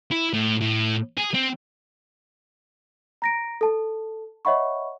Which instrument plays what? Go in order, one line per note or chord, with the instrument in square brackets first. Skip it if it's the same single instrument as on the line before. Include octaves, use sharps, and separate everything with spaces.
[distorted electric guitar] E4
A2
A2
G#4
C4
[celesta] A#5 A#6 D7
A4 A5
C#5 D#5 E5 F#5 B5 C#6